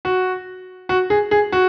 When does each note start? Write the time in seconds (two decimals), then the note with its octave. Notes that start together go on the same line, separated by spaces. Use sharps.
0.05 F#4
0.89 F#4
1.10 G#4
1.31 G#4
1.52 F#4